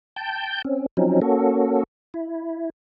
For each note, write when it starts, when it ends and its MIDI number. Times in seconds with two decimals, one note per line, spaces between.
0.16 0.62 79
0.16 0.62 81
0.16 0.62 91
0.65 0.86 60
0.65 0.86 61
0.97 1.20 53
0.97 1.20 54
0.97 1.20 60
0.97 1.20 61
0.97 1.20 63
1.22 1.83 58
1.22 1.83 61
1.22 1.83 66
1.22 1.83 69
2.14 2.70 64